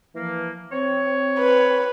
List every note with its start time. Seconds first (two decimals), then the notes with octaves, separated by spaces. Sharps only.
0.15 E3 F3 A#3
0.72 C4 C#5
1.39 B4